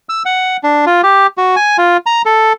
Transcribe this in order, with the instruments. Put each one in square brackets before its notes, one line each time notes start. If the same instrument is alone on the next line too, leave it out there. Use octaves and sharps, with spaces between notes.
[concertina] E6
F#5
D4
F4
G4
F#4
G#5
F4
A#5
A4